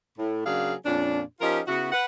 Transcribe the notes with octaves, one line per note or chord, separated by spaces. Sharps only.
A2
C#3 F#3 A#3 D4 G#4 F5
F2 A#2 C#4 D4
F3 C#4 D#4 F4 G4 A#4
C#3 B3 E4 F#4
B4 F#5